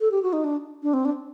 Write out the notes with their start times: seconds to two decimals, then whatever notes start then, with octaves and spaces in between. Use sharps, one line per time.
0.01 A4
0.11 G4
0.23 F#4
0.33 D#4
0.44 D4
0.83 D4
0.94 C4
1.05 D4